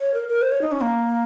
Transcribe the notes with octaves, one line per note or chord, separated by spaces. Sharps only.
C#5
A#4
A#4
C5
C#5
D#4
C#4
A#3